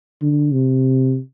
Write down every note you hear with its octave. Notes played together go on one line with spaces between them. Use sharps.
D3
C3